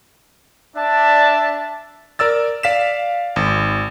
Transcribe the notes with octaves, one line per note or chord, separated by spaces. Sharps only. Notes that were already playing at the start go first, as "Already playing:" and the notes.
D4 D5 E5 A5
A#4 D5 E6 A6
D5 F5 B6 E7
G#1